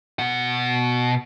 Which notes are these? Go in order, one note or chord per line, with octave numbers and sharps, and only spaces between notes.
B2 F#5